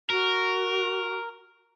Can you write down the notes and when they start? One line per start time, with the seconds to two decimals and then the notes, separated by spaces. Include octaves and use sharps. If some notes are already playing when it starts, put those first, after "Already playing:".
0.10 F#4 A#4